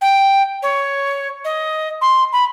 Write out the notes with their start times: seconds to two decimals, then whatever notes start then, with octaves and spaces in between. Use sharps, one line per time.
0.01 G5
0.63 C#5
1.45 D#5
2.01 C6
2.33 B5